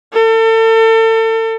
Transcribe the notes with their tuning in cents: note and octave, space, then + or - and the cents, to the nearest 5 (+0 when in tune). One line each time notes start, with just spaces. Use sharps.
A4 +35